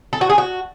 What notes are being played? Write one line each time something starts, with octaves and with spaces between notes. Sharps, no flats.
A4
F#4
G#4
F#4